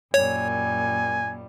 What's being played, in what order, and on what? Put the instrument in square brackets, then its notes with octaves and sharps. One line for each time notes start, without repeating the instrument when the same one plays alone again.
[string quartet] F#2 A#2 G3 [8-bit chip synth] C#5 [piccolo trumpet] G#5